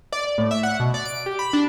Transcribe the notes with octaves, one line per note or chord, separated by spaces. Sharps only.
D5
D5
A2
E5
F#5
B2
D5
D7
G4
B5
D4